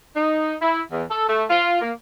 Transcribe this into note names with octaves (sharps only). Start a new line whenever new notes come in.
D#4
E4
E2
A4
A3
F4
A#3